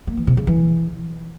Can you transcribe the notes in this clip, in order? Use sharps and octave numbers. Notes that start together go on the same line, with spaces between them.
A#3
E3
C3
C#3
E3